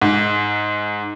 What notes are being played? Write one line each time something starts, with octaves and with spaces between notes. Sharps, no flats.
G#2